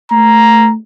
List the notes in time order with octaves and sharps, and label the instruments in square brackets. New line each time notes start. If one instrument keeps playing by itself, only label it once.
[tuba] A3 [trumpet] A#5